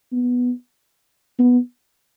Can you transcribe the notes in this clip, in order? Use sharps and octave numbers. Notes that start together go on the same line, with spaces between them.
B3
B3